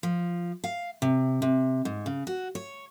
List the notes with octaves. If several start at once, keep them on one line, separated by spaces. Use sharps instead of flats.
F3
F5
C3
C3
G#2
C#3
F#4
C#5